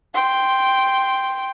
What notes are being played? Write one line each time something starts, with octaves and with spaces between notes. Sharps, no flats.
G5 C6